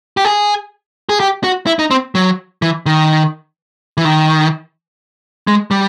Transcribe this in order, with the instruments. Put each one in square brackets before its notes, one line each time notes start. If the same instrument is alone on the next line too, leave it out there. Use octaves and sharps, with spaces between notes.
[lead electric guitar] G4
G#4
G#4
G4
F#4
E4
D#4
C4
F#3
E3
D#3
E3
D#3
G#3
G3